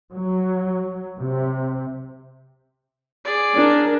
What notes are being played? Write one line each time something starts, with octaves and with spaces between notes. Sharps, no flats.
F#3
C3
G#4 D5
D4 A#4